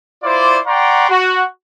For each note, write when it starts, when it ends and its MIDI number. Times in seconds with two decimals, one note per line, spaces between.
0.23 0.58 64
0.23 0.58 65
0.23 0.58 72
0.23 0.58 74
0.67 1.08 74
0.67 1.08 78
0.67 1.08 79
0.67 1.08 82
0.67 1.08 84
0.67 1.08 85
1.10 1.43 66